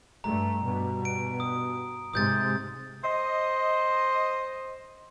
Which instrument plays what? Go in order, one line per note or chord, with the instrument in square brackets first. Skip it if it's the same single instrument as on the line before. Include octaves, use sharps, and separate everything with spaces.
[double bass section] G2 A3 [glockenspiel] A#5
[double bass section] G2 B2
[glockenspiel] D7
D#6
[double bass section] G#2 C3 G#3 [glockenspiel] D#6 G6 A6
[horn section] C5 D#5